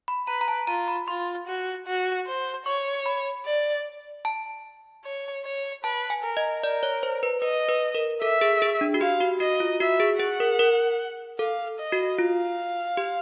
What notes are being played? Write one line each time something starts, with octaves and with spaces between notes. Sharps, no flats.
B5
B4 A#5
A#5
A5
F4 A#5
B5
F4 C6
F#4
F#4
C5
C#5 C#6
B5
D5
A5
C#5
C#5
B4 A5
G#5
A#4
D#5
A#4 D5
C#5
C5
B4
B4 D#5
B4
A#4
A4 E5
G#4
G#4
D4
F#4
G4 F5
F#4
F#4 D#5
F4
F#4 E5
G#4
G#4 F#5
A#4
A#4
A4 F5
D#5
F#4
F4 F5
G4